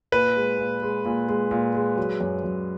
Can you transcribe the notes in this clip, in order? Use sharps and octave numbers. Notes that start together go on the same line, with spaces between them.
A#2 B4
G#3
A#2
G#3
A#2
G#3
A#2
G#3
F#3
F#2
F#2